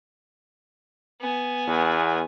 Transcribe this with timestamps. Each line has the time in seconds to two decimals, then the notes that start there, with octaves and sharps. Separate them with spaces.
1.21 B3 G#5
1.67 E2